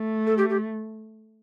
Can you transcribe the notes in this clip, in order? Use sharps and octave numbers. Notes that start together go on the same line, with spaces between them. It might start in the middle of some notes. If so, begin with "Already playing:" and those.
Already playing: A3
A4
G4
G4